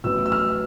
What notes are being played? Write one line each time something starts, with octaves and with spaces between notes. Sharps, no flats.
A1 A2 F#3 B3 E6
E6
F6